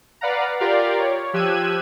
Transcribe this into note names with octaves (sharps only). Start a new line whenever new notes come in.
B4 D5 F5 F#5 A#5
F4 G4 A#4 D5 F5
C#5
F3 G4 E6 F#6 G#6 D#7